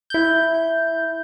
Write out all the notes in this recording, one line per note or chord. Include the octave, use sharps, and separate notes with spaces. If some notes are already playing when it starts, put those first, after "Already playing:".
E4 G6